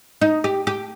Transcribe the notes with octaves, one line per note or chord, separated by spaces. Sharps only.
D#4
G4
G4